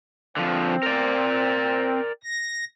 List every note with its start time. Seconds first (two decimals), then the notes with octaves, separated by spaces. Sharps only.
0.37 D3 F3 C4
0.83 A#4 D5
2.23 A#6